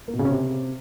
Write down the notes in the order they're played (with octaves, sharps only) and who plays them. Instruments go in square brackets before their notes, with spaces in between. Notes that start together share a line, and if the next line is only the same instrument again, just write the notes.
[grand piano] A#3
B2
C#3
C#4
C3